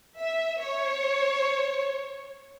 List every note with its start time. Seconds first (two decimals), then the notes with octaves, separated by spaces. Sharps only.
0.18 E5
0.60 C#5